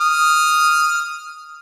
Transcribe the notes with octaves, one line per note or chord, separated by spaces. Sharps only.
D#6 F6